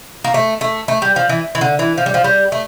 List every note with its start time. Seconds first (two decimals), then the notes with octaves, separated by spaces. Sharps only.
0.24 A#3
0.34 A3
0.61 A3
0.88 A3
1.02 G3
1.16 F3
1.29 E3
1.55 E3
1.61 D3
1.79 E3
1.98 F3
2.06 G3
2.14 F3
2.24 G3
2.52 A3